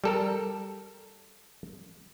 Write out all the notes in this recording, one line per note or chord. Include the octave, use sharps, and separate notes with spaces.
G3 A4 A#4